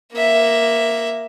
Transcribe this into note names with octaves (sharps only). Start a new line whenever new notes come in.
A#3 E5